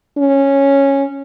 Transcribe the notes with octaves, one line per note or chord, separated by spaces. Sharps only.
C#4